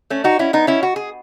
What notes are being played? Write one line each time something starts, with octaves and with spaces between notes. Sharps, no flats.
A3 C#4
D#4 F#4
C#4 E4
B3 D#4
C#4 E4
F#4
G#4